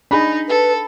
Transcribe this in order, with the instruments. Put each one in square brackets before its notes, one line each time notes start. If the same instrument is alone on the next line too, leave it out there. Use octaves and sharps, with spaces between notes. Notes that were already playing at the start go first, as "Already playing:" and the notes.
[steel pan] D4 G#4 [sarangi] D#4 [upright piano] B5
[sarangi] A4 [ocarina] B4